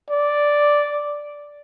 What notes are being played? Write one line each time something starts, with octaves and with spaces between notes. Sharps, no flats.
D5